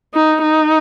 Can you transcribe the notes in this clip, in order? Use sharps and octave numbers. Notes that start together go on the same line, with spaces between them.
D#4
D#4